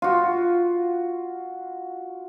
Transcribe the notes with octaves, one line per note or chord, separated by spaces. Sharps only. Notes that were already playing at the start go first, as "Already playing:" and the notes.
F4 F#4